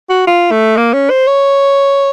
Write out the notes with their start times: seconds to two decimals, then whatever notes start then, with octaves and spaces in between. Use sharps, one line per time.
0.10 F#4
0.27 F4
0.51 A3
0.77 A#3
0.94 C#4
1.10 C5
1.27 C#5